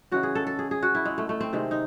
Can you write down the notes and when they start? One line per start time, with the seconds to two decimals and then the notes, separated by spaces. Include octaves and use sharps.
0.11 C#3 E3 G#3 F#4
0.23 G#4
0.35 A4
0.47 A4
0.59 G#4
0.71 G#4
0.82 F#4
0.95 E4
1.05 G#3
1.18 A3
1.29 A3
1.41 C4
1.53 C3 D#3 G#3
1.71 D#4